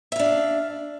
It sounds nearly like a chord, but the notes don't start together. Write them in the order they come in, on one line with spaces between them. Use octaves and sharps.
E5 F5 D4